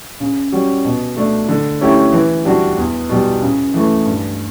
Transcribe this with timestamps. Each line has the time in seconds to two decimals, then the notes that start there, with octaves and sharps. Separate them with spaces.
0.20 C#3
0.52 G3 C#4 F#4
0.85 B2
1.17 A3 D4
1.49 D3
1.81 A3 C#4 E4 G4
2.13 E3
2.45 G3 D4 F#4
2.77 E2
3.09 B2 G3
3.42 C#3
3.74 E3 A3
4.06 G2